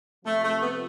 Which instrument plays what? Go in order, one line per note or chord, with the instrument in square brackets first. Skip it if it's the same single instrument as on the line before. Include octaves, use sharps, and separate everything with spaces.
[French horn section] C3 F3 C4 F4 [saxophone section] A3
[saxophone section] A3
B3